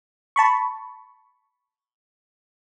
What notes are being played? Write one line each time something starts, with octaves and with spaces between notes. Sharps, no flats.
A5 B5 C#6